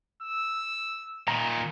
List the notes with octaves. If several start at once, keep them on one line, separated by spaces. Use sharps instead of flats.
E6
A#2 D#3 A#5